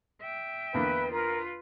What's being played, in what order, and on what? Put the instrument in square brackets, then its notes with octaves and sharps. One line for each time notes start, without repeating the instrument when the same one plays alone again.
[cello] E5 G5
[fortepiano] E2 D3 A#3 [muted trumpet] B4
[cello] F4 B4 [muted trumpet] A#4